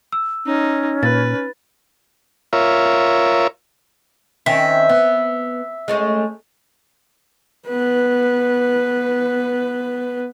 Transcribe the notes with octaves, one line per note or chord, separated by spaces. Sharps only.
E6
C#4 D#4
A#2 B4 A6
F4 A#4 C#5 E5
D#3 C4 C#4 E5
B3
G#3 A3 C#4
B3 B4